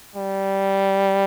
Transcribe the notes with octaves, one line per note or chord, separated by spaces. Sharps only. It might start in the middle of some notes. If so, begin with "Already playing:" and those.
G3